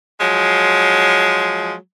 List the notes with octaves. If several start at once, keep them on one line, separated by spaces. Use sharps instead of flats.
F3 F#3 G#3